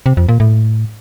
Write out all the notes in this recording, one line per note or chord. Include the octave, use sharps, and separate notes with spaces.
C3
F2
A#2
A2